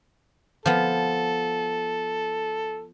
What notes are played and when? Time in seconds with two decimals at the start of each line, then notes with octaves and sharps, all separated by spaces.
0.66 F3 B3 A4